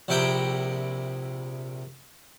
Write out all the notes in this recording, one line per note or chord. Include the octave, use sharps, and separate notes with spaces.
A#1 C3 E4 G5 A#5